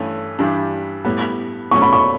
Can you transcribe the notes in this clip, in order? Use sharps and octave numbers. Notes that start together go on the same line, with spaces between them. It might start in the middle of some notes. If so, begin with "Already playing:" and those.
Already playing: G2 E3 A3 C#4
G2 E3 G3 D4
A2 G3 B3
B2 F#3 A3 C#4 C#6
B5
C#6